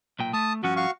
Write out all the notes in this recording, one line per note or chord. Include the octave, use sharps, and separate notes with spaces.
B1 A#2 G5
A3 A5 D#6
G2 F3 C#4 F#4
F#4 F5 C#6